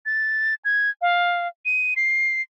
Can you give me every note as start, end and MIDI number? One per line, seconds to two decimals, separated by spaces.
0.06 0.54 93
0.65 0.90 92
1.01 1.48 77
1.65 1.94 99
1.96 2.42 96